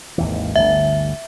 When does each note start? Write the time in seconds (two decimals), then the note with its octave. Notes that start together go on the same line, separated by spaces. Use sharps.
0.18 G#1 D#2 E3
0.56 G1 D2 E5